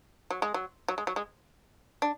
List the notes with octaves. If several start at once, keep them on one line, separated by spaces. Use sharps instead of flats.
F#3
G#3
F#3
F#3
G#3
F#3
G#3
D4